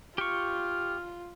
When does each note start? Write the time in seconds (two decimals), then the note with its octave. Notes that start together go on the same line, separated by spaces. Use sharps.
0.18 F4 G4 C#6 F6